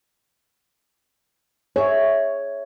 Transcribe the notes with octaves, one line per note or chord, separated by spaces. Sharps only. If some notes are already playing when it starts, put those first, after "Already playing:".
G#4 C#5 E5